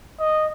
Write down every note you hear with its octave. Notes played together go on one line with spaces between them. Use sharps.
D#5